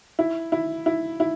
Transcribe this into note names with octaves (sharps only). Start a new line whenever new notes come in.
E4
E4
E4
E4